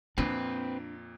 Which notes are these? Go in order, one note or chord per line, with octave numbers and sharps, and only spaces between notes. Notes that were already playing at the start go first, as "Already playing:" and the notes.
F2 A#2 C4 D4 B4